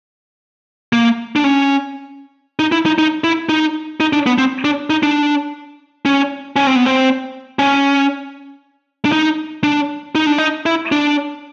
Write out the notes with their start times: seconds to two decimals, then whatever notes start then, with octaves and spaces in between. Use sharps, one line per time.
0.93 A#3
1.36 D4
1.44 C#4
2.59 D#4
2.72 E4
2.86 D#4
2.98 D#4
3.24 E4
3.49 D#4
4.00 D#4
4.13 D4
4.26 B3
4.38 C4
4.65 D4
4.90 D#4
5.03 D4
6.05 C#4
6.56 C#4
6.67 C4
6.76 B3
6.86 C4
7.59 C#4
9.05 D4
9.12 D#4
9.64 D4
10.15 D#4
10.27 D4
10.38 D#4
10.66 E4
10.92 D4